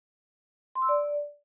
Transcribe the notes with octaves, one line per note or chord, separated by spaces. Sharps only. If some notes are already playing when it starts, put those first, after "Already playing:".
C6
E6
D5